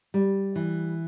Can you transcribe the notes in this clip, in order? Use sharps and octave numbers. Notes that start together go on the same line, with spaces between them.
G3
E3